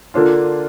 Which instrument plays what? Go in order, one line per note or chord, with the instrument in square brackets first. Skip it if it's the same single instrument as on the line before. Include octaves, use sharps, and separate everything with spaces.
[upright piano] D3 A#3 D4 F4